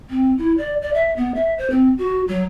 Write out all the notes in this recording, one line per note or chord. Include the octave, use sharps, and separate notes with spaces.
C4
E4
D5
D5
E5
B3
E5
C5
C4
F#4
F#3